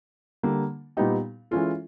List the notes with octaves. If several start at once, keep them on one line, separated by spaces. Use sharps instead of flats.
D3 G3 A#3
A#2 G3 B3 D#4 G4
E3 G#3 C#4 F4 A4